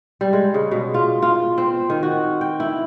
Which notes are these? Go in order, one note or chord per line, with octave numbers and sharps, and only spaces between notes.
G3
G#3
C#3
B2
F4
F4
C4
D#3
F#4
G5
E4